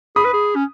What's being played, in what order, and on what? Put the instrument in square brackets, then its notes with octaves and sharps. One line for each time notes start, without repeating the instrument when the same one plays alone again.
[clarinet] G#4 [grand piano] B5 D#6
[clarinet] B4
G#4
C#4